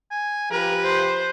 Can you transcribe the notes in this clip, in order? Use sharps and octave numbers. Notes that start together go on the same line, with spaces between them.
G#5
F3 G4 A#4 B4
C5